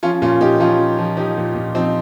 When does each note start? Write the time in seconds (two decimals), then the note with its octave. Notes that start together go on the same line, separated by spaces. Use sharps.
0.03 F3 C#4 F4
0.22 A#2 C#4 F4
0.40 A#2 D#4 G4
0.60 F3 C#4 F4
0.79 F3
0.98 F3
1.17 F3 D#4 G4
1.37 A#2
1.55 A#2
1.75 F3 C4 D#4